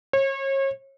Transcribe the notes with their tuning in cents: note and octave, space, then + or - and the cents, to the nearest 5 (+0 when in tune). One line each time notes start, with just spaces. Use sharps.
C#5 -35